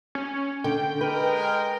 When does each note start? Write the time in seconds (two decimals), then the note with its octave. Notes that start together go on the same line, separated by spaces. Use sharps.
0.15 C#4
0.64 D3 G5
1.01 G#3 A#4 B4